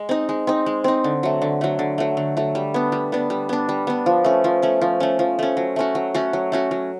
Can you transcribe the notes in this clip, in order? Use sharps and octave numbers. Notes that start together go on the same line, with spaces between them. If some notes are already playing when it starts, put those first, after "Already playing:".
Already playing: G#3
C4 D#4
G#3
C4 D#4
G#3
C4 D#4
D3
F#3 A3
D3
F#3 A3
D3
F#3 A3
D3
F#3 A3
G3
B3 D4
G3
B3 D4
G3
B3 D4
G3
B3 D4
F3
A3 C#4
F3
A3 C#4
F3
A3 C#4
F3
A3 C#4
F#3
A3 C#4 F#4
F#3
A3 C#4 F#4
F#3
A3 C#4 F#4
F#3